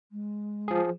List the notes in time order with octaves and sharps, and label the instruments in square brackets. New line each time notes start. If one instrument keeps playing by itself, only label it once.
[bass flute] G#3
[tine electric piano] F3 G#4